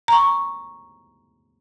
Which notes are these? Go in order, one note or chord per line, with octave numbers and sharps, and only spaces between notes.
A#5 C#6